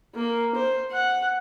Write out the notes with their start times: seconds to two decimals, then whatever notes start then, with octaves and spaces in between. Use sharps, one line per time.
0.15 A#3
0.55 C5
0.92 F#5